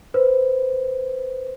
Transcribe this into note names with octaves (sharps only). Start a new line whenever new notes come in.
B4 C5